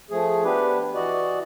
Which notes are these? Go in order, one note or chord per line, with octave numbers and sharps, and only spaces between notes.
F3 A3 G#4
B3 D4 G4 B4
E3 F#4 D5 D#5